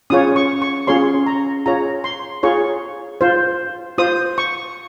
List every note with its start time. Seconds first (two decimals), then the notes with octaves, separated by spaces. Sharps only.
0.10 C#4 F4 G#4 C#5 D#6
0.36 C#6
0.62 C#6
0.87 C#4 F4 G#4 C#5 C6
1.26 A#5
1.66 F4 G#4 C#5 A#5
2.04 C6
2.43 F4 G#4 C#5 C#6
3.21 F4 C5
3.98 F4 C5 D#6
4.38 C#6